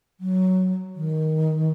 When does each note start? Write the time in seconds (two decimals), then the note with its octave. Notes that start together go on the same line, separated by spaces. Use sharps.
0.20 F#3
0.96 D#3